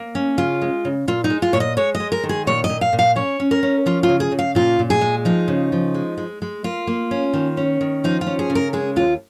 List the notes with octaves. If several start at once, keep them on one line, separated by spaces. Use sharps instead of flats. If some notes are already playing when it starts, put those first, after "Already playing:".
Already playing: A#3
C#4
C#3 F4
G#3
C#3
A#2 F4
D#4
G#3
F4
A#2 C#5
D#5
G#3 C#5
D#5
G#3
A#4
D#3
G#4
A#2 C#5
D#5
A#2
F5
A#2
F5
C#4 C#5
C#4
A#4
C#4
F3 F4
F4
C#3
G#4
C#3
F5
A#2 F4
A#2
G#4
G#3
F3 D#4
C#3
F3
G#3
G#3
G#3
A#3 F4
A#3
C#4
D#3
C#4
D#3
F3 D#4
F4
C#4
G#4
C#3
A#4
G#3 G#4
D#2 F4